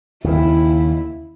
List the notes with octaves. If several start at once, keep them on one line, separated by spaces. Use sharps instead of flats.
D#2 C#3 E4